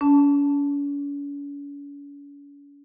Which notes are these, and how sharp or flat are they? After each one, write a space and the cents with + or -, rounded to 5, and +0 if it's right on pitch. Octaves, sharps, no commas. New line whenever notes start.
C#4 +45 A5 +0